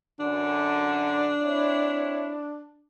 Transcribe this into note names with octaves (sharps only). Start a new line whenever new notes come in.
F#2 D3 D4
C4 E4 C#5